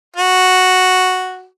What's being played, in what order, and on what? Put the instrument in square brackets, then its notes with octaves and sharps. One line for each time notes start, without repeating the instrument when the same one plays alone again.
[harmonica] F#4